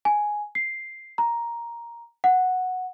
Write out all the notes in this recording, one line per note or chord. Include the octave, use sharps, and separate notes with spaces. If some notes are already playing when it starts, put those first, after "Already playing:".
G#5
C7
A#5
F#5